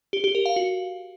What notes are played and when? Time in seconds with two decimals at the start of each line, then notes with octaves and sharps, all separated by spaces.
0.13 G4
0.24 G4
0.35 A#4
0.46 F5
0.56 F#4